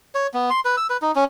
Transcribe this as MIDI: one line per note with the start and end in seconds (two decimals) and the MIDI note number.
0.15 0.27 73
0.34 0.50 59
0.50 0.60 84
0.65 0.76 71
0.77 0.87 88
0.90 0.97 71
1.02 1.12 63
1.16 1.24 61